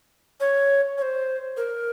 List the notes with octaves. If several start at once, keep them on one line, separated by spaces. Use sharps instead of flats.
C#5
C#5
C5
A#4